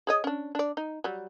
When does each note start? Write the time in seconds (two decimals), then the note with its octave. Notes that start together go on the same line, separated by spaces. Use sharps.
0.07 G#4 C#5 D#5
0.24 C#4 D4
0.55 D4 D5
0.77 D#4
1.04 F#3 G3